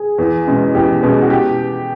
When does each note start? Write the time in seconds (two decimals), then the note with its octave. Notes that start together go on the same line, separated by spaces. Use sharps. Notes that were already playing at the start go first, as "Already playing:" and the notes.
Already playing: G#4
0.18 E2
0.46 B2 G#3 C#4
0.75 E2 G4
1.02 B2 G#3 C#4
1.21 F#4
1.30 G4